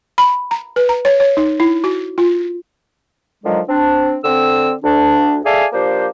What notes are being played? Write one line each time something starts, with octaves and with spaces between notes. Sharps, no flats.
B5
A#5
B4
A#5
C#5
C#5
D#4
E4
F#4
F4
D3 D#3 F3 F#3 G#3
C4 D4
D3 C4 E6
D2 D4
G#4 A4 D5 E5 F5 G#5
F3 A#3 D4 G4 C5